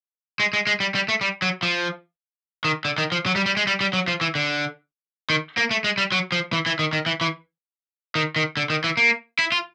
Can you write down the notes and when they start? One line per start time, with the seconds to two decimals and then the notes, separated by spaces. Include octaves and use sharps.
0.40 G#3
0.53 G#3
0.67 G#3
0.80 G3
0.95 G3
1.08 A3
1.21 G3
1.42 F#3
1.63 F3
2.64 D#3
2.85 D3
2.98 D#3
3.12 F3
3.26 F#3
3.36 G3
3.46 G3
3.57 G#3
3.67 G3
3.81 G3
3.93 F#3
4.08 F3
4.21 E3
4.35 D3
5.30 D#3
5.57 A#3
5.71 A3
5.84 G#3
5.98 G3
6.12 F#3
6.32 F3
6.53 E3
6.66 E3
6.79 D#3
6.93 D#3
7.06 E3
7.21 E3
8.15 D#3
8.36 D#3
8.57 D3
8.70 D#3
8.84 E3
8.97 A#3
9.39 E4
9.52 F4